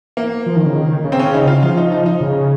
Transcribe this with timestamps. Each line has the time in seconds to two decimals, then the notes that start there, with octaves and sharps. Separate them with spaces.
0.17 A#3
0.46 F3
0.56 D#3
0.66 C#3
0.75 D#3
1.04 C#3
1.12 C4
1.19 C#4
1.34 D#4
1.48 F4
1.63 F3 F4
1.77 D#4
1.92 D#4
2.06 D#4
2.21 C#3